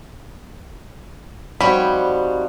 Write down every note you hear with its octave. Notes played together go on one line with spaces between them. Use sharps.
D#3 F3 G3 C4 F#4 G4 C#5 B5